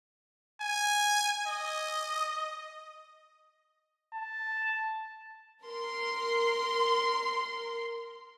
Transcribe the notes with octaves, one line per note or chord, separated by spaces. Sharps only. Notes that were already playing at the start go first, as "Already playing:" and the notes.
G#5
D#5
A5
A#4 C6